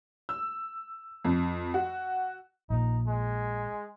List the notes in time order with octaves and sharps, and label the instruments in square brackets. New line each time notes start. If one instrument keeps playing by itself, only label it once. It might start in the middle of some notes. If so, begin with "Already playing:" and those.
[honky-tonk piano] E6
F2
F#4
[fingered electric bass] A#1 A#2 [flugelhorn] D#4
[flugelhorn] G#3